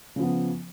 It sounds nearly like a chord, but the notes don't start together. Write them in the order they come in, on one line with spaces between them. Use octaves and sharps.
C#3 F3 B3